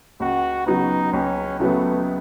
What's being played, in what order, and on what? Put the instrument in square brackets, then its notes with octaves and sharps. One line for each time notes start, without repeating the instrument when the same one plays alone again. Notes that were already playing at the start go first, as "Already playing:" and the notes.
[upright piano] C#2 [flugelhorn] F#4
[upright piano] C#3 F#3 B3 [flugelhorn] D#4
[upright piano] C#2 [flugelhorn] C#4
[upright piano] C#3 F#3 B3 [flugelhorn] A3